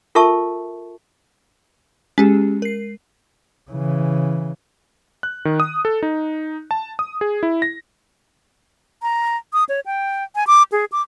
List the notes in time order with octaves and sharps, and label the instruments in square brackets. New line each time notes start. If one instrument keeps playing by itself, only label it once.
[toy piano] F4 A4 A#4 E5 A5 C#6
[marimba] G#3 [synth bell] C#4 G4 G#4
[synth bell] A#4 C7
[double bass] C#3 E3
[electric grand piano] F#6
D#3
D#6
A4
D#4
A5
D#6
G#4
E4
A#6
[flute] A#5
D#6
C#5
G5
G#5
D6
G#4
D6